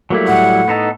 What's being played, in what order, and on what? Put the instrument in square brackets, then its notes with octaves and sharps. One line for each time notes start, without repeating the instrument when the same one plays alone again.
[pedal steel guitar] F#3 G3 E4 [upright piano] A3 A#3
[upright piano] A2 [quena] F#5
[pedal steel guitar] B3 D#4 A4